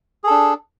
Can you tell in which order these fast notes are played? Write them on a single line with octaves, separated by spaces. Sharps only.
G#4 A4 D4